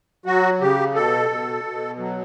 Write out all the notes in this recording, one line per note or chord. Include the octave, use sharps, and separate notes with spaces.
F#3 F#4
C#3 G4
B2 A4
B2
B2
F#3